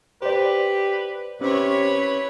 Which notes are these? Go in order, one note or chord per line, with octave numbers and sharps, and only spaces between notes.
G4 B4 C5 D5
C3 C#4 E4 B4 C#5